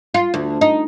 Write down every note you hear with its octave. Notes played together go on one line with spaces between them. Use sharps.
F4
D2
D#4